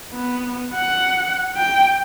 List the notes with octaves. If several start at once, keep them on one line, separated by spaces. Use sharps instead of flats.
B3
F#5
G5